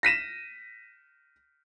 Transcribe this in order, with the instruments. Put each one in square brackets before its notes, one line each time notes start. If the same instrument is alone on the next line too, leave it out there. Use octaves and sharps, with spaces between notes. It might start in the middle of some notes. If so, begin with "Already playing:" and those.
[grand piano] A#6 B6 D#7 E7